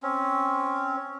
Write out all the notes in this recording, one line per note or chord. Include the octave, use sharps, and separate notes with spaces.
C4 C#4